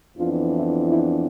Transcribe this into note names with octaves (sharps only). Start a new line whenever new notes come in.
F2 E3 B3 D4 F4
E4
E4